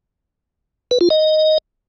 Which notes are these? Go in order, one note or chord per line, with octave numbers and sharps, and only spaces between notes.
B4
F4
D#5